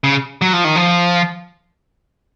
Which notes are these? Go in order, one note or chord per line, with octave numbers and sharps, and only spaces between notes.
C#3
F#3
F3
D#3
F3